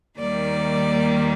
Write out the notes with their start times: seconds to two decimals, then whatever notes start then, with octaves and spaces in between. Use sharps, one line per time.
0.19 D#2 D#3 G3 A#3 D5